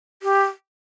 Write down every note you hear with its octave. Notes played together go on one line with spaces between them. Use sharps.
G4